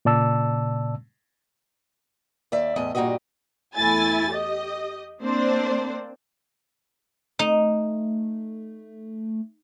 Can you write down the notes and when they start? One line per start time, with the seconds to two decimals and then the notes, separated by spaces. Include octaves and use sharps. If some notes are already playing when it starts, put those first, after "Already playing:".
0.05 A#2 C#3 D5 A5 E6
2.52 D#2 D5 E5
2.76 E2 A2 D#5
2.95 G2 A#2 F#3 F#4 G4 D#5
3.76 E2 A3 E4 G#5 A6
4.32 G4 D#5
5.23 A#3 C4 D4 C5 D5
7.39 A3 D#4